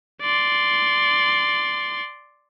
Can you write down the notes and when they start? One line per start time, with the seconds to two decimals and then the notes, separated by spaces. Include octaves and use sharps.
0.22 D5 C6